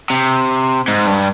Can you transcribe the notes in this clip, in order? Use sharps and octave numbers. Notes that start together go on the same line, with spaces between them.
C3
G#2
G2